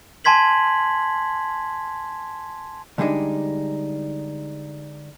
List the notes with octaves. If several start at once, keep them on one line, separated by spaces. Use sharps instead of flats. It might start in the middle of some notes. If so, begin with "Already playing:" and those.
G#5 A5 C6 G#6 B6 F#7
D3 G3 G#3 D4 D#4